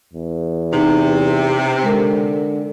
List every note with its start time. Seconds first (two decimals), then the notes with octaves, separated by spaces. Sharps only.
0.13 E2
0.73 C3 D#4
1.83 D3 G#3 A#4